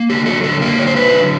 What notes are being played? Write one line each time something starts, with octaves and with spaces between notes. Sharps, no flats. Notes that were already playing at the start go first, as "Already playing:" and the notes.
Already playing: A#3
D3 G4
F#3 A4
D3 A4
A#3 A#4
D3 C#5
C5
F#3 B4
D3